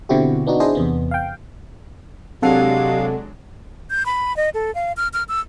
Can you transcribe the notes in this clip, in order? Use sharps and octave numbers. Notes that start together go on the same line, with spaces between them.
B2 D3 C4 E4 F#4 G4
B3 D4 D#4 F#4
D4 E4 G#4 C5 D#5
E2 C3 B3
F5 G5
C3 F#3 G#3 D4 G4 A4 F5 F#5
G6
B5
D#5
A4
F5
F6
F6
E6